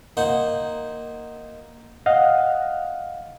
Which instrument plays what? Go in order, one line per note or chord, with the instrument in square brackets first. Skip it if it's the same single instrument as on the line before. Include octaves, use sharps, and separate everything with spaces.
[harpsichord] A#3 D#4 C5 F#5
[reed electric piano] D#5 F5 F#5